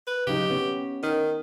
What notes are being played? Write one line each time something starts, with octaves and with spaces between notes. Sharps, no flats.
B4
C#3 F#3 D#4 G4
B3 C#4
D#3